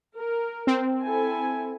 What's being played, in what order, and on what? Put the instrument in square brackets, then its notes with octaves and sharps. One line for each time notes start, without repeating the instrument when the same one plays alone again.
[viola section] A#4
[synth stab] C4
[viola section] E4 A4 G#5